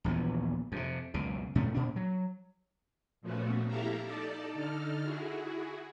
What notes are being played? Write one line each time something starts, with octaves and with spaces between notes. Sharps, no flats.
D#1 A#1 E3 B3
F2 C3
F#1 C#2 B2
G2 B2 A3 C#4
A#2 D4
F#3
A#2 F3 A3 B3 C#4 F#4
E4 G4 A4 E5 F5 A#5
D#4 A4 D5 A5
D3 D#4 A4 F6
E4 F#4 G#4